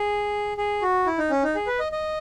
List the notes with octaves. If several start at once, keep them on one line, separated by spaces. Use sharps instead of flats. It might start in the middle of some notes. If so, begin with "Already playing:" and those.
Already playing: G#4
G#4
F#4
E4
D#4
C#4
D#4
G#4
B4
D#5
D#5